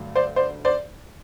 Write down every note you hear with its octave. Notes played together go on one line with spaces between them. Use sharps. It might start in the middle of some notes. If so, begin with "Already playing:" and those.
Already playing: G2 D3 F#3 A3
C5 D5
C5 D5
C5 D5